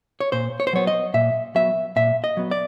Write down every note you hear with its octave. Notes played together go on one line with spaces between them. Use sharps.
C#5
A#2 C5
C#5
C5
F#3 B3 C#5
D#5
A#2 E5
F#3 B3 E5
A#2 E5
D#5
F#3 B3
D5